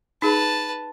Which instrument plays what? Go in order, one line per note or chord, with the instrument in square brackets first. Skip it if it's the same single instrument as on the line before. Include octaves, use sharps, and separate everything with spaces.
[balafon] D#4 G#4 [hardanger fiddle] B4 A5